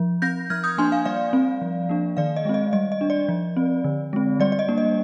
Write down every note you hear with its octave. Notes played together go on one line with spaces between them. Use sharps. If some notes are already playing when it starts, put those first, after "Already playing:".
Already playing: F3
C4 G6 A#6
F3 F6 G#6
D#6 G6
A#3 D4 G#5 C6
F5 G#5
G3 D5 F5
C4
F3
A#3 D4
D#3 D5 F5
D#5
G#3 C4
D#5
G3 D#5
D#5
D4
D5
F3
C4
D3
G#3 C4
G3 D5
D5
D#5
A#3 D4
D#5